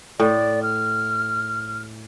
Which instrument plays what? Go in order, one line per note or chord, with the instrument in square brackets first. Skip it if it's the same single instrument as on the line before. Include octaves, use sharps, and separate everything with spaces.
[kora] A2 [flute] D5
[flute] F6